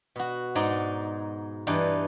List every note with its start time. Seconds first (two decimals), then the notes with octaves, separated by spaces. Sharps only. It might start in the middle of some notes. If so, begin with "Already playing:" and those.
0.16 B2 F#4
0.55 G#2 G#3 D#4 D5
1.67 G2 E3 D#4 D5